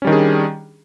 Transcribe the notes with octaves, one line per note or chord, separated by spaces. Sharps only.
D#3 G3 C#4 D4 G#4